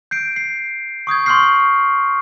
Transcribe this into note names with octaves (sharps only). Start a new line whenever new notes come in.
G6 C7 D7
C7
C#6 D#6 G6 G#6
C6 C#6 D#6 F6 G6 C7